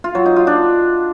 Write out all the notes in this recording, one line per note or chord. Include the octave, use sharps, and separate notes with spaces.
F4
F#3
D#4
F4
D4